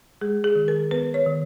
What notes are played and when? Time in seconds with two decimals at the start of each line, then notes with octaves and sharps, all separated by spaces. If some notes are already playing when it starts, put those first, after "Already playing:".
0.21 G#3 G#4
0.44 G#4
0.55 D#3
0.68 A#4
0.91 B3 B4
1.14 C#5
1.26 D#3